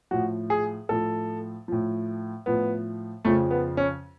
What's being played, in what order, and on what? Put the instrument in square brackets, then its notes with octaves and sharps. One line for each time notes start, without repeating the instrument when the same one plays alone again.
[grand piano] A2 F3 F#4
G#4
A2 F3 A4
A2 F3
A2 F3 B3
F2 C#3 F3 A3
B3
C#4